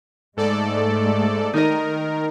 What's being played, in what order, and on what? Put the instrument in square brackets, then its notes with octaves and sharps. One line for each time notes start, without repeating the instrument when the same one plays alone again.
[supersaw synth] G#2 A4 D5 [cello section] G#3 A3
[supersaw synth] D#3 A#4 [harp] D#4 D#5